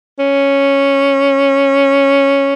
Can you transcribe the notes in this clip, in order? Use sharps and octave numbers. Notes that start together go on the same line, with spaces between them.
C#4